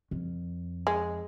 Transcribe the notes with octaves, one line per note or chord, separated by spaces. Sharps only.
F2
G#3